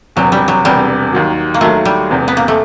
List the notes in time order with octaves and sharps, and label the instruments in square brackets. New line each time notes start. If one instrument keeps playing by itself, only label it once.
[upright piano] E1 E2 C3 [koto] F#3
[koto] G3
F#3
[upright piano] E1 E2 C3 [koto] G3
[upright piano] D#2 D#3 F#3
[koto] A#3
[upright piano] D#2 D#3 F#3 [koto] A3
[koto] G3
[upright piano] E1 E2 C3
[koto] B3
A#3
A3